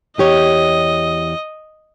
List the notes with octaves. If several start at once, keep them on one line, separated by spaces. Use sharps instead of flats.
E2 G4 C#5 D#5